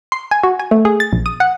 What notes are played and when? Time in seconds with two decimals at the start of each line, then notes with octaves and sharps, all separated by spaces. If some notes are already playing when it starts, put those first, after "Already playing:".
0.12 C6
0.31 G#5
0.43 F#4
0.59 G#5
0.71 A3
0.85 G#4
1.00 A6
1.13 A#1
1.26 D#6
1.40 F#5